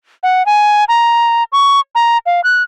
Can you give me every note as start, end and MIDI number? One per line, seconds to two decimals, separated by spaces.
0.23 0.45 78
0.46 0.84 80
0.88 1.43 82
1.52 1.80 85
1.95 2.18 82
2.26 2.41 77
2.44 2.63 90